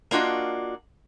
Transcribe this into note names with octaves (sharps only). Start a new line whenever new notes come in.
A#3 D4 F4 F#4 D#5